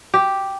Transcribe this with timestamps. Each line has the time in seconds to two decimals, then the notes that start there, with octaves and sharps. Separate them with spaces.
0.14 G4